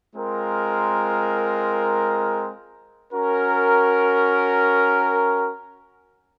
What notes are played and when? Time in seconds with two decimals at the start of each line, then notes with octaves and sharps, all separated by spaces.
0.13 G#3 C4 F4 A#4
3.12 C#4 F#4 A#4